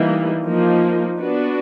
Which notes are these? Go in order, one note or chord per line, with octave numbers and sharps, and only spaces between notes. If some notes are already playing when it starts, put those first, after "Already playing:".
Already playing: E3 G3 A#3 D#4
F3 A#3 D#4
B3 D4 F#4 B4 D5